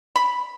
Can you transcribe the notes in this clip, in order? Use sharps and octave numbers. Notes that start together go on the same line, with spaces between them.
B5